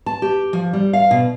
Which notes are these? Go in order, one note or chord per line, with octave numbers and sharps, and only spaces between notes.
A5
G4
F3
G3
F5
B2